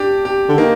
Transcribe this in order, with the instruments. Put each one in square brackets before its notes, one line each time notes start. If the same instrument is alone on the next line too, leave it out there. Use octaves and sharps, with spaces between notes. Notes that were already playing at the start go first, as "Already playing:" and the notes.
Already playing: [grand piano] D4 G4
G4
[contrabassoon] D3
[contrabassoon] D#3 [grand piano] A#3